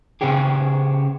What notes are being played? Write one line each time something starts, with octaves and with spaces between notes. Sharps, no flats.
C#3 B3 C#4 G4 G#4